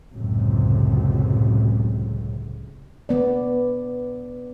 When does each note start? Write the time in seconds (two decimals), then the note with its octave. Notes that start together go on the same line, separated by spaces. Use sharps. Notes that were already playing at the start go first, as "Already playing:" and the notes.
0.12 C#2 F#2 A2 C3
3.09 B3 D5